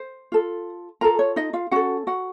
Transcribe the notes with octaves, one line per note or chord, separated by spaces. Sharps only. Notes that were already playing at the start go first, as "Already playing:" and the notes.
Already playing: C5
F4 A4
F4 A4 A#4 A#5
C#5
D#4 D#5
F4 F5
C#4 F#4 A4 F#5
F#4 F#5